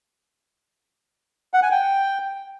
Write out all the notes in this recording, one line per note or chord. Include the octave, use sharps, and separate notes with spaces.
F#5
G#5
G5